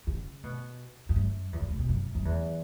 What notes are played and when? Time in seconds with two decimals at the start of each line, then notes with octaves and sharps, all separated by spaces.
0.07 C#3
0.44 B2
1.09 G2
1.16 F#2
1.53 E2
1.61 F#2
1.70 C#3
1.79 B2
1.89 F#2
2.15 F#2
2.25 E2